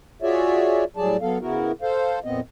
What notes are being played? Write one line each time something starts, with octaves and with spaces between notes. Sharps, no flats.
F4 F#4 G#4 C#5 D5 E5
A2 F#3 G3 G#4 D5 A5
F#3 B3 A4 F5
C#3 B3 E4 F#4 A#4
A4 C5 F5
F2 A#2 B3 C4 D#5